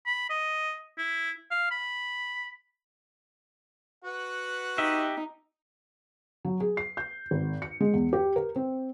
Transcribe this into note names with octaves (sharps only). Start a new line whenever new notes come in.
B5
D#5
E4
F5
B5
F#4 B4 F#5
D#4 G4 D#5 E5
F#3
G#4
C7
G6
G#1
C#7
G#3
E2
G4
A#4
C4